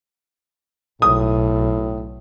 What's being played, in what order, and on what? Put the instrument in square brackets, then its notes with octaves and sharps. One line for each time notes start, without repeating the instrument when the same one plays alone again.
[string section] B1 [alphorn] A2 [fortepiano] D#6